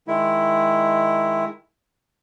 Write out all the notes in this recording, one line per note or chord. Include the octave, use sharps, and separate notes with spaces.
D#3 G#3 E4